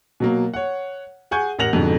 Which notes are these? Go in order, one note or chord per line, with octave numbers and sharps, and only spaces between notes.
B2 F#3 A#3
C#5 F#5
G#4 F#5 G#5 C#6 G6
A1 A#4 F#5 A#6 F7 F#7
F2 G#2 B2 D3